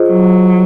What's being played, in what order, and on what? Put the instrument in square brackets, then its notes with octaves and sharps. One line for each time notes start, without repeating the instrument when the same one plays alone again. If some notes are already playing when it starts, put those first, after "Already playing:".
Already playing: [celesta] F4 G#4 C5 D#5
[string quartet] F#3